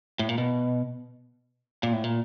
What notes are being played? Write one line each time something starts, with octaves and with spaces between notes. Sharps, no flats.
A2
A#2
B2
A#2
A2
A#2